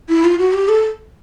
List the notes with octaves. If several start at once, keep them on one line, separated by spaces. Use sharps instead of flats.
E4
F4
F#4
G4
A4